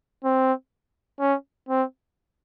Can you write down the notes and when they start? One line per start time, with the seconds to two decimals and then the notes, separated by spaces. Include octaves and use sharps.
0.24 C4
1.20 C#4
1.69 C4